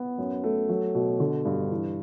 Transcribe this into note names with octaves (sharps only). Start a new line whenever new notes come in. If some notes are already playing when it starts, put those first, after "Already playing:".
Already playing: B3
F#2
A3
F#3
B2
D3
G2
E3